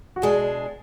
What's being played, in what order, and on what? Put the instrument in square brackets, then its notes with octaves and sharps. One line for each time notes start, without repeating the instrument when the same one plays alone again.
[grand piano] F#4
[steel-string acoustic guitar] B2 G#3 D4 [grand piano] G#4